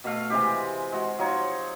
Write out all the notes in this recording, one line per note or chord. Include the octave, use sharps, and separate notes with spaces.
B2 A3 F5
C3 E3 G#3 G4
G#3 F#4
F3 F#3 D#4 C#5